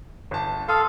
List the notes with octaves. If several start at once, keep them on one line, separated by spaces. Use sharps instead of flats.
G1 A5
A4 F5 C6 D#6